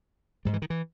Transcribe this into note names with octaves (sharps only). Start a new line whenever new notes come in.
G#2 G3
E3
D#3
E3